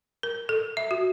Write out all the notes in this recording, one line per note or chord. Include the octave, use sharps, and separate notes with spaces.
A#4
A4
E5
F#4